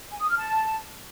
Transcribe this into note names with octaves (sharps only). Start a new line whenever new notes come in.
G#5
D#6
F6
A5